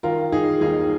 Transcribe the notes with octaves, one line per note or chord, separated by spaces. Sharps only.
D#3 F4 A#4
D#3 D#4 G#4
D#2 D#4 G#4